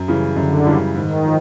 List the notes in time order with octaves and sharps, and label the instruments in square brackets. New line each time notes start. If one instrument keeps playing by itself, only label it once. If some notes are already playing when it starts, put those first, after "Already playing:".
Already playing: [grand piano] F#2
C#3 E3 G3
[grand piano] F#2 [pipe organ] D3
[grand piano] C#3 E3 G3
[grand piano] G#2 [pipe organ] D#3
[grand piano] F3